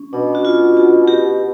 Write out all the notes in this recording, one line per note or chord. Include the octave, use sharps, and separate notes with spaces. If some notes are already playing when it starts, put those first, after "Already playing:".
Already playing: C#4
B2 D4
F#4
F4
F#4
G4